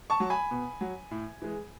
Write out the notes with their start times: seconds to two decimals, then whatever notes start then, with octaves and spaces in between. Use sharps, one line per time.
0.10 A5 C#6
0.20 F#3
0.30 G#5 B5
0.51 B2
0.81 F#3
1.11 A2
1.42 E3 G#3